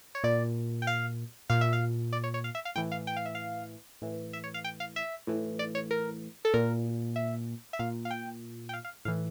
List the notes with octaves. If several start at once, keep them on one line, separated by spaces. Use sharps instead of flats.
C#5
A#2 D5
G5
F5
A#2 F5
E5
F5
D5
C#5
C#5
F5
E5
F5
A2 E3 G5
F5
G5
F5
E5
F5
A2 E3
E5
C#5
F5
G5
F5
E5
A2 E3
D5
C#5
A#4
A4
A#2 A#4
E5
E5
A#2 F5
F5
G5
G5
F5
F5
A2 E3 F5